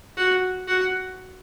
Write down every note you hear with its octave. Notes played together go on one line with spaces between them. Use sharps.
F#4
F#4